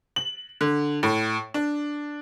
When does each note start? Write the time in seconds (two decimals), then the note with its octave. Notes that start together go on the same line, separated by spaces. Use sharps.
0.16 F#7
0.61 D3
1.03 A2
1.54 D4